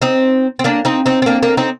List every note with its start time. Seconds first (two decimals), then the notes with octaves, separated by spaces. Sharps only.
0.02 C4 D#4
0.59 C4
0.64 A#3 D4
0.85 C4 D#4
1.06 C4 D#4
1.22 C4
1.26 A#3 D4
1.43 A#3 D4
1.57 C4 D#4